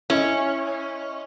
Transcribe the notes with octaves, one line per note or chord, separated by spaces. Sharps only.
C#4 E4 D#5